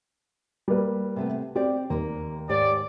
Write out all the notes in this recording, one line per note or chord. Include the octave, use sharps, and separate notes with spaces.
G3 A#3 B4
C3 A3 B3
C4 G4 D5
D#2 A#3
G#2 G4 C#5 D5